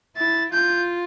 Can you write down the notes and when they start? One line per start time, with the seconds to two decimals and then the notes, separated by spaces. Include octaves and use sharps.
0.17 E4 A6
0.53 F4 G6